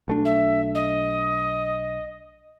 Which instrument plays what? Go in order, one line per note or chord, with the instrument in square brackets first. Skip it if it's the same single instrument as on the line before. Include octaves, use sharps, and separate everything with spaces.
[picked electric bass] B1 A3 D4
[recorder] E5
D#5